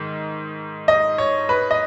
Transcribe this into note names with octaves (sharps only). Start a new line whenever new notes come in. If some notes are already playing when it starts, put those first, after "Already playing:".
Already playing: G#2 D#3
D#5
C#5
B4
D#5